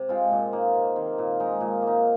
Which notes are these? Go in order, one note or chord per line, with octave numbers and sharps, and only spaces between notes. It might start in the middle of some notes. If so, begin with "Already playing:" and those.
Already playing: C3
G#3 C4 F4
A#2
A#3 D#4
C3
D#3 C4
A#2
G#3 D#4
A#2
A#3 D#4